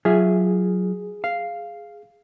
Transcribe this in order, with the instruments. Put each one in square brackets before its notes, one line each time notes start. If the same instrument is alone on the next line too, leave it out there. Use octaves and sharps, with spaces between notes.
[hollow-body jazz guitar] F#3 F4 E5 [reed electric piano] G#4
[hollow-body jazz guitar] F5